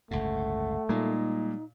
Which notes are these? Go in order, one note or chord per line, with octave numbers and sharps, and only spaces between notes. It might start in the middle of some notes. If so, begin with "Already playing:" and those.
G1 C#2 A2 A3 F#5
A#2 G3 G#3 A#3 D#4